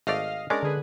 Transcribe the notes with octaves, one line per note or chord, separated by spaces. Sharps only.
G#1 A3 D5 D#5 F5
G#3 C#4 D4 A#4 D5
D3 G#4 B4